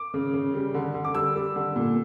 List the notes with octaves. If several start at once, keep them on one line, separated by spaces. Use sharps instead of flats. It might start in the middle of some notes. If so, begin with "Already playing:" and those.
Already playing: D6
C#3
C#3
G3
D3
D3
D6
G3 E6
G3
D3
A#2